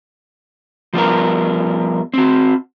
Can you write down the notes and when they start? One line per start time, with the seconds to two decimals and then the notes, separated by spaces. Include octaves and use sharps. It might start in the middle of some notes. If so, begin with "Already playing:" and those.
0.93 F3 G3 B3 A#4
2.14 C4 F#4